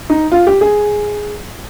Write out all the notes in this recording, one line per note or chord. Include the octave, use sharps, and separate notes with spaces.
D#4
F4
G4
G#4